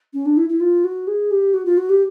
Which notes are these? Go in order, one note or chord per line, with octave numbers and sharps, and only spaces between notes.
C#4
D4
E4
E4
F4
F#4
G#4
G4
F#4
F4
F#4
G4